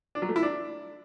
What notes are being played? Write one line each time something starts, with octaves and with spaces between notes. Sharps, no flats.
D4
F#3
A3
E4
D4